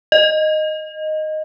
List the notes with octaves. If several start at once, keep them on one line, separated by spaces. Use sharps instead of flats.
D#5